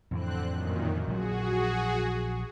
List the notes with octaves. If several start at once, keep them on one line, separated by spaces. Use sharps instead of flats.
F2 A2 D3 E3 C4 F#6
F#2 A#2 D#3
A#1 F3 F#3 F#4 G#4